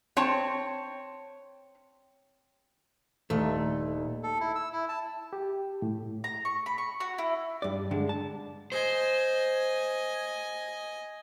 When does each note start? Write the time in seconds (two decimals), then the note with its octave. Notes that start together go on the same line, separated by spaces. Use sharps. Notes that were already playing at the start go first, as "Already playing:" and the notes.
0.17 C4 C#5 A5
3.30 D#1 A3
4.23 A4
4.40 E4
4.55 E6
4.72 E4
4.89 A5
5.33 G4
5.82 A2
6.24 A#5
6.45 C#6
6.66 B5
6.78 C#6
7.00 F#4
7.18 E4
7.62 G2 D5
7.91 G2 D3 G#3
8.09 A5
8.72 C5 D#5 G#5